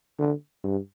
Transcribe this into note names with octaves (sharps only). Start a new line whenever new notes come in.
D3
G2